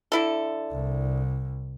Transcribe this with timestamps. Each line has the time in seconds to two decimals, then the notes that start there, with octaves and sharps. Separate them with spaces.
0.12 D3 E4 A4
0.71 C2